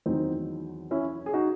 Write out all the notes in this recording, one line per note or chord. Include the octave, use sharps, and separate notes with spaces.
E2 D#3 F#3 C4 D#4
C#4 E4
G#4
D#4 F#4